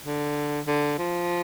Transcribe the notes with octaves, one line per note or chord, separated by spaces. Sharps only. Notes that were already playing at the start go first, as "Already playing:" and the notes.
D3
D3
F3